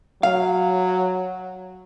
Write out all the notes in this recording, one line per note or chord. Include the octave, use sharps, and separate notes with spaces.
F#3 F5